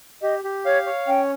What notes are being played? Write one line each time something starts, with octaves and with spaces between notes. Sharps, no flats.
G4 D#5
G4
C#5 F5
C#5
C#4 G5